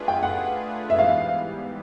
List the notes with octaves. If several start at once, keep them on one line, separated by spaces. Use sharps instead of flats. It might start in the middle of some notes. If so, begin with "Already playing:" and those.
Already playing: A3 D4 F4 G#4 B4
G5
F#5
E5
G#2 E3 G3 B3 F5